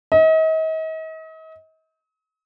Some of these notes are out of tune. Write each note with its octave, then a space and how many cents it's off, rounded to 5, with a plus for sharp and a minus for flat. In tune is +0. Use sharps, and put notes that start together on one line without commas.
D#5 +40